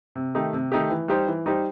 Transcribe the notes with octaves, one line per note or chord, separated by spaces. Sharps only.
C3
D#3 A3 D#4 G4
C3
D#3 A3 D#4 G4
E3
G3 D#4 G4 C5
E3
G3 D#4 G4 C5